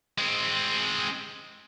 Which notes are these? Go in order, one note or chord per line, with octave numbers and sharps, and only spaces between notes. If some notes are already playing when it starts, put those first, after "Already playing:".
G#3 C4